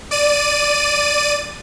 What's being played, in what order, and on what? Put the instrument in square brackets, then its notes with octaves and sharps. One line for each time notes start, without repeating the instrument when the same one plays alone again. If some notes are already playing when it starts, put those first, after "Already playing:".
[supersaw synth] D5 D#7